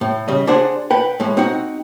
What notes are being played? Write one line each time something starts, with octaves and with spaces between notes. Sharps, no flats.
A2
C#3 G3 D#5
D4 F#4 G#4 C5 F#5
B4 F#5 G5
A2 G#3
C4 D#4 F#4